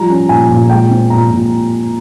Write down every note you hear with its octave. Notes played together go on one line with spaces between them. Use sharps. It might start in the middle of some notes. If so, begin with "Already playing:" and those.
Already playing: F3 G3 A#5
C#4
A#2 G#5
A#2
G#3 G5
C4
A#2 A#5
A#2